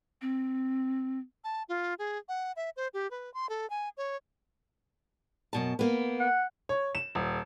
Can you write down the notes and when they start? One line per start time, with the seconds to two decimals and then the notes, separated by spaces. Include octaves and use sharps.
0.21 C4
1.44 A5
1.69 F4
1.99 G#4
2.29 F#5
2.56 E5
2.77 C5
2.94 G4
3.11 B4
3.34 C6
3.49 A4
3.70 G#5
3.97 C#5
5.53 F#2 B2 A5
5.79 A#3 B3
6.20 F#5
6.69 C#5
6.95 E7
7.15 D#1